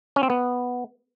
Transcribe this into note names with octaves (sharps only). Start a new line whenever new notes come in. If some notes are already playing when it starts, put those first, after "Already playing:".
C#4
C4
B3